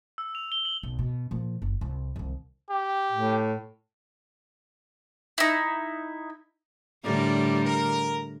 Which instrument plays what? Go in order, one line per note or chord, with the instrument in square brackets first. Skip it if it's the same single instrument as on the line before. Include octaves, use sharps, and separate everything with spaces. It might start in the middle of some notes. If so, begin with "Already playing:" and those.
[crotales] E6
F7
G7
F#7
[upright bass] B1
B2
A#2 F3
F#1
C2
C2 D#3
[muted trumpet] G4
[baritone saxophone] A2
[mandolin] D#4 E4
[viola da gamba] A2 D3 G3 [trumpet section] A#4 D5 A#5
[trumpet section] A#4